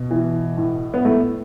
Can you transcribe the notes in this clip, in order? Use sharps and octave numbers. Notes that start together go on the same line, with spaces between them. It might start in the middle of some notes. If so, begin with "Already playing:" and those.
Already playing: B2
E3
A2
B3
A2 A3